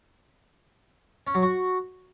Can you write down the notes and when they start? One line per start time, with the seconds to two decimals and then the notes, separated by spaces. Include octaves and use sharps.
1.27 C#4
1.35 F#3
1.42 F#4